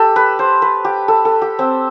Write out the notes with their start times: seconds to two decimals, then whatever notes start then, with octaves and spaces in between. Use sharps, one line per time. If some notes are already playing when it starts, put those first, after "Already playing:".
Already playing: G4 A4
0.16 B4
0.39 C5
0.62 B4
0.85 G4
1.08 A4
1.25 A4
1.42 G4
1.59 C4